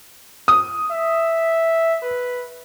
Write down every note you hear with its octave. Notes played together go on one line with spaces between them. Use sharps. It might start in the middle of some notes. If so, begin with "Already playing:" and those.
D#6
E5
B4